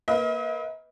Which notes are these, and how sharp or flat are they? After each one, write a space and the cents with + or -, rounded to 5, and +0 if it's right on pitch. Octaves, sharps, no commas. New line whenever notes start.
A#3 +0 B4 +0 D#5 +45